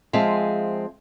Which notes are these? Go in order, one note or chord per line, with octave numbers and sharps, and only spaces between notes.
F3 G#3 C4 G#4 E5 F5